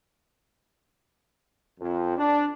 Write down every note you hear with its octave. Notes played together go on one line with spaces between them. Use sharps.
F2
D4